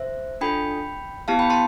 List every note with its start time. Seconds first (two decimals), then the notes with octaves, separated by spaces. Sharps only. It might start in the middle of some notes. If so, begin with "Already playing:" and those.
Already playing: C5 E5
0.41 D4 F4 A4 G5 B5
1.28 B3 E4 G4 F5 A5
1.39 G5 B5
1.50 A5 C6